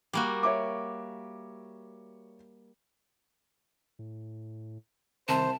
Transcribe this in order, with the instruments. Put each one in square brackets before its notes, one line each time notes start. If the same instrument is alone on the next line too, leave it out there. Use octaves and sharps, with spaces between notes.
[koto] G3 A#3 F#4
[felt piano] C#5 E5 D6
[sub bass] A2
[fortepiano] C2 [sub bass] D#3 [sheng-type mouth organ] C5 [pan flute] A5